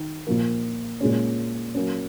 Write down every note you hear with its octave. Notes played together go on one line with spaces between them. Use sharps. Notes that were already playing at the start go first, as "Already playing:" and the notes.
Already playing: D#3 D#4
A#2 F3 A#3
A#2 G#3 C#4
F#3 A#3 C#4